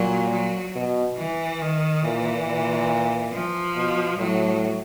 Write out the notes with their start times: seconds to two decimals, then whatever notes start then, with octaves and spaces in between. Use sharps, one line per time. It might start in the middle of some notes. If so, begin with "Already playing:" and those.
Already playing: A#2 F#3
0.32 F#3
0.75 B2
1.18 E3
1.61 D#3
2.04 A#2 E3
2.47 A#2
3.33 F3
3.76 B2
4.19 A2 F#3